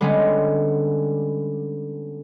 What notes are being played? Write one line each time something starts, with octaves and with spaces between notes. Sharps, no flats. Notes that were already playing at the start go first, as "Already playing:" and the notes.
D3 G3 G#3 B3 C#4